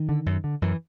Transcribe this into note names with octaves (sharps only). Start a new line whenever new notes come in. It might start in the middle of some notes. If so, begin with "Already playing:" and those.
Already playing: D#3
D3
F#2
D3
F#2 E3